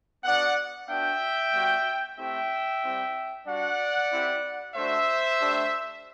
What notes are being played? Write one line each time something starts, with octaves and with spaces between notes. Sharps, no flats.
B3 D4 F#4 D5 F#5
B3 D4 F#4 E5 G5
G3 B3 F#4
A3 C4 E4 G4 E5 G5
G3 C4 E4 G4
G3 D4 F#4 D5 F#5
C4 E4 G4
A3 D4 F#4 C5 E5
A3 D4 G4